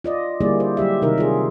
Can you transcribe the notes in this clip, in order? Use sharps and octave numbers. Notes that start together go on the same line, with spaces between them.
F4 D5 D#5
D3 G3 A#3 E4 G#4 D5
C5
F#3 G3 G4 E5
C3 D#3 D#4 A#4 E5
F4 G#4